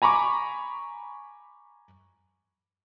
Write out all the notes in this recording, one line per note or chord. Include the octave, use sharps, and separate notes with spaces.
G#5 A#5 B5 C#6 D6